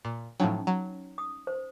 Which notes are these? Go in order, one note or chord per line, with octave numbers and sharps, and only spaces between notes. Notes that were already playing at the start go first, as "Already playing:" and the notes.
A#2
A2 F3 F#3 C#4 D#4
F#3
D#6
C5